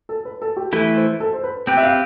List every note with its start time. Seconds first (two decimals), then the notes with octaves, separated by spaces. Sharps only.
0.09 A4
0.25 B4
0.42 A4
0.57 G4
0.72 E3 A3 E4 A4
0.96 C5
1.20 A4
1.33 C5
1.44 B4
1.67 C4 G4 B4 G5
1.77 E5
1.83 F5